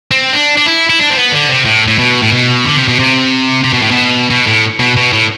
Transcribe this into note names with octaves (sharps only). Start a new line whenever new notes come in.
C4
D4
D4
E4
E4
D4
C4
B3
D3
C3
A2
A2
B2
A2
B2
D3
C3
B2
C3
C3
B2
A2
B2
B2
A2
B2
B2
A2